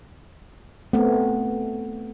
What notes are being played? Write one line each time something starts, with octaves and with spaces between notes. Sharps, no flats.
A3 B3 C4